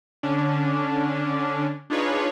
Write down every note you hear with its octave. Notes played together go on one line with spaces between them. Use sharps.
D3 C#4 D4
D4 D#4 F4 G#4 B4 C#5